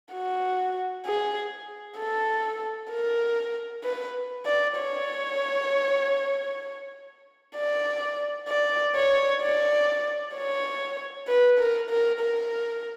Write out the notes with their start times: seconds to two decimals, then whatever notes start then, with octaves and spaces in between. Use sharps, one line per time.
0.13 F#4
1.06 G#4
1.99 A4
2.91 A#4
3.84 B4
4.46 D5
4.77 C#5
7.56 D5
8.48 D5
8.96 C#5
9.42 D5
10.35 C#5
11.28 B4
11.59 A#4
11.90 A#4
12.21 A#4